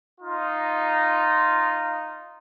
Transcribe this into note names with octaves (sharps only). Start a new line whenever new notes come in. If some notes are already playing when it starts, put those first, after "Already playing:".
D#4 F4